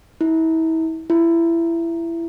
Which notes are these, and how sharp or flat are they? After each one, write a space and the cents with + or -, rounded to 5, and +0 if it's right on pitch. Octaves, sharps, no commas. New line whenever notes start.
E4 -35
E4 +20